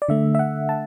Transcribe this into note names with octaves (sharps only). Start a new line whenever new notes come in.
D5
D3 A3 E5
E5
F#5
A5